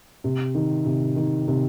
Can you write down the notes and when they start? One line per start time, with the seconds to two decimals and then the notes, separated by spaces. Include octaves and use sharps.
0.24 C3
0.55 D#3
0.86 C3
1.16 D#3
1.48 C3